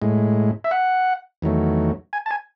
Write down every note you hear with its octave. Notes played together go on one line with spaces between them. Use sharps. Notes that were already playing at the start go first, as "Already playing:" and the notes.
A2 G#3
E5
F#5
E2 D#3 F#3 A3
G#5
A5
G#5